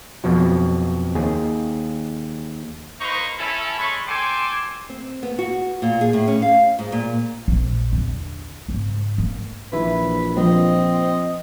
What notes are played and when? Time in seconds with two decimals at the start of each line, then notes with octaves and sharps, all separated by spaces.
0.24 F2 B2 F3 F#3
1.15 D#2 G#4
3.01 A#3 D#4 B4 C5 A#5 C#6
3.39 C#4 E4 A4
3.79 G#3 A4 C#5 B5 C#6
4.08 A4 G5 G#5 C6 D6
4.90 C4
5.23 B3
5.39 F#4
5.82 A#2
6.01 G#4
6.13 A2
6.27 C#4
6.42 F5
6.79 G#2
6.92 A#2
7.48 A#1
7.93 E2 D3
8.68 G#2 C#3
9.18 A#3
9.73 A#1 E3 E4 B4
10.37 F3 C4 D#5